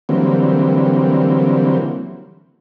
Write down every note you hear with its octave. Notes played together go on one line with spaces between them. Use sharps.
D3 E3 F#3 G3 A#3 C4